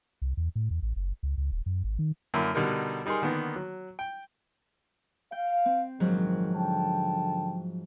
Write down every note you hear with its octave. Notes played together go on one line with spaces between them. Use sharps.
C2
E2
A2
E2
A1
F#1
C#2
C#2
D#1
F#2
G#1
D#3
F#2 D3 A#3 E4
B2 D3 G3 D#4 A#4
G3 D#4 G#4 A#4 C6
D3 D#3 A#3 B3
F#3
G5
F5 G5
C4
A#1 G#2 D#3 F3 F#3
D3 G5 A5